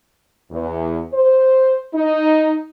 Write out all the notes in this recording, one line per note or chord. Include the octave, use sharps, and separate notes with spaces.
E2
C5
D#4